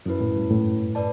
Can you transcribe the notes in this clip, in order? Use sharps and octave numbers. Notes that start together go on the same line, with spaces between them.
F#2 C#4 E4 B4
A2
G2
A2
B4 D5 A5